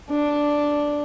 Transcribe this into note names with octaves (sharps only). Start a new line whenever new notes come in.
D4